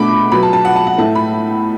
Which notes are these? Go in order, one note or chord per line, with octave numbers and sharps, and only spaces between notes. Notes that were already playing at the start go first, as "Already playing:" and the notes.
Already playing: B2 A3 D4 B5 D6
B2 F#3 B3 B5
A5
A5
F#5
A5
F#5
A2 A3 E4 A5
B5